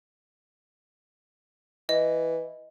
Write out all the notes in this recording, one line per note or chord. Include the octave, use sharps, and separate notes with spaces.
E3 D#5